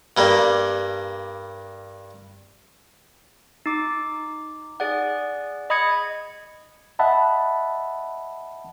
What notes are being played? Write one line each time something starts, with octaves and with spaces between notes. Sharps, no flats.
G2 G3 A#3
D#4 D6
G#4 D5 F#5
D#5 B5 D#6 G#6 C#7
D#5 E5 F#5 A5 B5